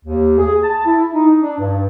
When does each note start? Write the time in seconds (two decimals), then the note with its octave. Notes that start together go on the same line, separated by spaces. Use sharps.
0.05 D#2
0.38 G#4
0.63 A5
0.85 E4
1.12 D#4
1.42 D4
1.58 G2